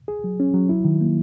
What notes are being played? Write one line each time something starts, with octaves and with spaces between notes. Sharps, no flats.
G#4
F#3
C#4
F#3
E4
D#3
A#3